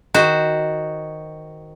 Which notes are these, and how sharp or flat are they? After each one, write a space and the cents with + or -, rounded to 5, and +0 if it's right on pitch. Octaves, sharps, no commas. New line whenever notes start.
D#3 +0 F#4 +0 C5 +0